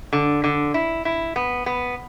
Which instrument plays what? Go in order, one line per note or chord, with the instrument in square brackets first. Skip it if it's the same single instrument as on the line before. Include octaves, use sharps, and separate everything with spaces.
[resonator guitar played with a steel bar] D3
D3
E4
E4
B3
B3